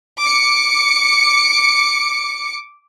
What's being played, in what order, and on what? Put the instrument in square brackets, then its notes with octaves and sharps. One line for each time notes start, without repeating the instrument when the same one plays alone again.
[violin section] D6 C#7